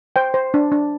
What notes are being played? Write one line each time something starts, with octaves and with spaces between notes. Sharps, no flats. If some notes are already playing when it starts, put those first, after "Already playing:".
C5 G5
C5
D4
D4